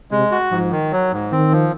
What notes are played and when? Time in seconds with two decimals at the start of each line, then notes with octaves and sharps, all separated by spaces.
0.11 C3 G#3
0.32 F#4
0.51 G#2 F3
0.72 D#3
0.92 F#3
1.12 G#2
1.32 D#3 C4
1.51 F3